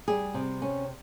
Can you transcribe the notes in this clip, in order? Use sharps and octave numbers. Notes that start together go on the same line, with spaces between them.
G3 G#4
C3
C#4